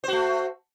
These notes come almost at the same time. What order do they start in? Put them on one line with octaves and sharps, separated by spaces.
C5 F#4 A3